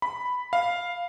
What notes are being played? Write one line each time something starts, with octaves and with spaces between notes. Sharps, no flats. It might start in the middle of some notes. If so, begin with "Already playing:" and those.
B5
F5